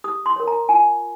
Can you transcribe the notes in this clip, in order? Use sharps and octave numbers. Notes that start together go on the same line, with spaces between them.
G4 D#6
C6
A#4 C#5
A#5
F4 G#5